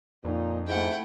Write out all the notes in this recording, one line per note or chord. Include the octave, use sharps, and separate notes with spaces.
F2 A#2 D#4
G#2 A3 E4 F#5 G5